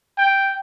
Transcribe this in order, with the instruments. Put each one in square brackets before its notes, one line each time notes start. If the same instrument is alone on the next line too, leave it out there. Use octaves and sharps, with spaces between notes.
[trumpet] G5